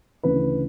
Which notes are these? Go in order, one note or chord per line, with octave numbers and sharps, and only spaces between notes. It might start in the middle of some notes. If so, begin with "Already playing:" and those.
D2 C#3 E3 B4